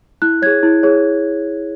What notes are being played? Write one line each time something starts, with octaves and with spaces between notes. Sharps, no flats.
E4 F#6
G#4 C#5 G#6
E4
G#4 C#5